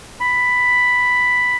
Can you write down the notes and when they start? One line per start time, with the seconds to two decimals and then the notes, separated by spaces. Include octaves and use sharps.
0.20 B5